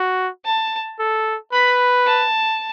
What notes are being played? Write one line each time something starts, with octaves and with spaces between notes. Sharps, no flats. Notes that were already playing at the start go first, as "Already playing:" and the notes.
Already playing: F#4
A5
A4
B4 B5
A5